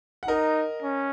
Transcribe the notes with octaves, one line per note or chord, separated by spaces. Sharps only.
F#5
D#4 A#4 D#5
C#4